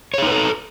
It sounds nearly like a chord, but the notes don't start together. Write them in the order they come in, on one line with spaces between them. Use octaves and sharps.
C#5 G#4 D#4 B4 A4